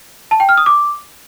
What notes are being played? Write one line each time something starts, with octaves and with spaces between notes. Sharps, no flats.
A5
G5
F6
D#6
D6